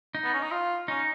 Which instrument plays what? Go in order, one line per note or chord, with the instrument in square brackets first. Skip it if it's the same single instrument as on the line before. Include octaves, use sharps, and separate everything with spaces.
[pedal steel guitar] D#4
[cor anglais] B3
C#4
D#4
F4
[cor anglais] C#4 [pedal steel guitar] D#4